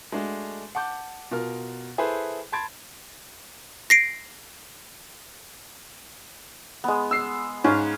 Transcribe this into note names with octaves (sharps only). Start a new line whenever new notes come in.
G#3 A3 D4 F#4
F#5 A5 D6 G6
B2 F4 A#4 F6
E4 G#4 A4 B4 C5
A5 B5 C6 G#6 A6 D7
A#6 C7 D7
G#3 B3
E6 C7
G#2 C#4 F5